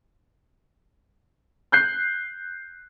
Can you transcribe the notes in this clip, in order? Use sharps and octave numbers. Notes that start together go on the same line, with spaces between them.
F#6 G6 C7